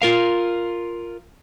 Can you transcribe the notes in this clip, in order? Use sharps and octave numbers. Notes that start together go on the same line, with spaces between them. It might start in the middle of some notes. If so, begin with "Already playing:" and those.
F4 A#4 F5